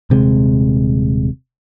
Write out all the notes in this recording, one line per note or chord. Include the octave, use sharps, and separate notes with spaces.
D#1 C3 G#3